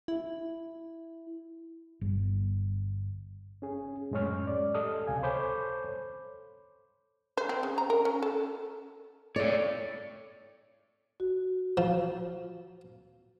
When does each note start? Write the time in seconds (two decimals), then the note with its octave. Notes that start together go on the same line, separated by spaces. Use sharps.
0.08 E4
2.01 G1
3.62 C#4 G#4
4.11 F#2 A2 G#3 C#4 C#5 F6
4.47 D5
4.74 G4 A4 D#5 A5 D#6 F6
5.07 C#2 C3 F5 G#5
5.23 A4 C5 C#5 B5 D6 G6
7.37 C5
7.49 C4
7.63 C#3
7.78 A#5
7.90 A#4
8.05 C#4
8.23 A4
9.36 A4 C#5 D5
11.20 F#4
11.77 F3